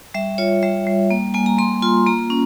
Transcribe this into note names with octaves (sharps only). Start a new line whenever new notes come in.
G3 E5
F4 C#5
G3 E5
G3
A#3
A#3 G#5
A#5
A#3 C6
F4 C6
A#3 A#5
C#4